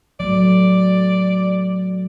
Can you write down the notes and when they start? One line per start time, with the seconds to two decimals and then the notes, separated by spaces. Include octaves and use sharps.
0.20 F#3 A3 D5